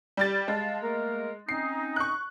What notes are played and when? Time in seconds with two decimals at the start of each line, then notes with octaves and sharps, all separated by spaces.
0.17 G3 G4 A6
0.48 G#3 F5 A5
0.82 A3 A#3 A#4
1.49 C4 C#4 D#4 C7
1.96 C#6 F#6